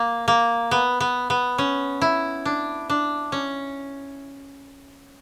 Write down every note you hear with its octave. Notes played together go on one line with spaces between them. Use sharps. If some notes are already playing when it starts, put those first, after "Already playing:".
Already playing: A#3
A#3
B3
B3
B3
C#4
E4
D4
D4
C#4